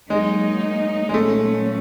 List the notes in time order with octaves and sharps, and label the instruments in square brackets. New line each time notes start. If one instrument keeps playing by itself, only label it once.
[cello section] F#3 A#3 D#4 [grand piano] G#3
[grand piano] G#3
[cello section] A#2 F#3 A#3 C#4 [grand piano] A3